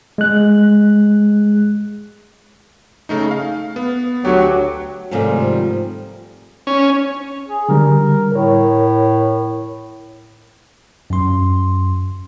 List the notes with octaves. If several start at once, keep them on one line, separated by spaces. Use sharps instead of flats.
G#3 F#6
C#3 A3 D#4
F5
B3
D2 F#3 G4
G#2 C3 D#3 F3 G3 A3
C#4
G#4
D3 G3 A#4
A2 A#4 C#5
F#2 C6